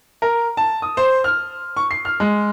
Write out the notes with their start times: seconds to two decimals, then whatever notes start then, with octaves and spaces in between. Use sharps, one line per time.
0.22 A#4
0.57 A5
0.82 D#6
0.97 C5
1.24 F6
1.77 C#6
1.91 C7
2.05 F6
2.20 G#3